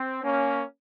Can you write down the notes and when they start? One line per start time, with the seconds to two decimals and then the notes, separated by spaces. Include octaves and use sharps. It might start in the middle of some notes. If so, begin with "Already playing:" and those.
Already playing: C4
0.23 A#3 C#4